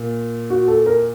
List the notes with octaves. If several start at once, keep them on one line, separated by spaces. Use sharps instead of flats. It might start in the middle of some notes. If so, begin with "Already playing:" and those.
Already playing: A#2
F#4
A4
A#4